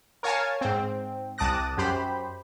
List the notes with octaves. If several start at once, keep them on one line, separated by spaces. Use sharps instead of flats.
A#4 C#5 F5 G#5 A5
G#2 C4
C2 A5 D6 D#6 F#6 A#6
F#2 G4 C5 B5